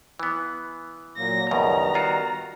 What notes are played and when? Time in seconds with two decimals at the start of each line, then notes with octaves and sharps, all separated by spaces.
0.19 E3 B3
1.18 A#2 F#3 A#3 A#6
1.51 C#2 F#2 B2 D#3 G3 B3 A#5
1.94 D#4 F4 F#4